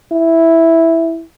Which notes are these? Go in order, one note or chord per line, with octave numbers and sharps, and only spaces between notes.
E4